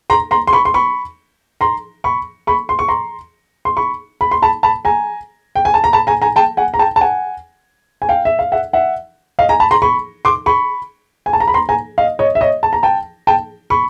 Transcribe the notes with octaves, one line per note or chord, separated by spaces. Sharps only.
A#5 C6
A#5 C6
C6
B5 C#6
C6
B5 C#6
A#5 C6
B5 C#6
B5 C#6
C6
C#6
A#5 C6
C6
B5 C#6
B5
C6
A5 B5
A5 B5
G#5 A#5
G5
G#5
A5
A#5
A5 B5
G#5 A#5
G#5 A#5
G5 A5
F#5 G#5
A#5
G5 A5
A5
F#5 G#5
G#5
F5 G5
E5
F5
E5 F#5
E5 F#5
D#5 F5
G#5 A#5
A5 B5
A#5 C6
B5 C#6
C6 D6
B5 C#6
G#5
A5
A#5
B5
A#5 C6
G#5 A#5
D#5 F5
C#5 D#5
E5
C#5 D#5
A5
A#5
G5 A5
G5 A5
B5 C#6